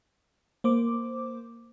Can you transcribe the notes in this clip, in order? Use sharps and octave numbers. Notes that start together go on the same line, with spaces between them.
A#3 C5 D6